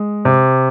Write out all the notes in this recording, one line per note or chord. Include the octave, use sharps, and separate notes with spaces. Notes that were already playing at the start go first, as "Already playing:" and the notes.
Already playing: G#3
C3